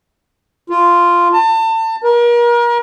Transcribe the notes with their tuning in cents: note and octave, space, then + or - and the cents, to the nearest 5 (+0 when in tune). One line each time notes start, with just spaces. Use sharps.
F4 -5
A5 +30
A#4 +35